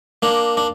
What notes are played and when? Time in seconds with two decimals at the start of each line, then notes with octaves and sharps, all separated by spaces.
0.22 A#3 D4
0.57 D4